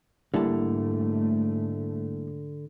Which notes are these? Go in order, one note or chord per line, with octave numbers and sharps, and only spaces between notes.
G#2 D3 G3 A3 A#3 E4 A5